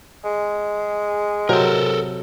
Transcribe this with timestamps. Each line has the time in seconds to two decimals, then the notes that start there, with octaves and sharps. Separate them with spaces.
0.25 G#3
1.49 C3 F#3 A4 A#4 C5